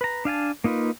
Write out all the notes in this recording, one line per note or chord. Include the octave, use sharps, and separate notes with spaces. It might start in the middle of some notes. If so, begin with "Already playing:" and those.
B4 A#5
D4 F5 G#5 A5
A#3 D#4 F4 B4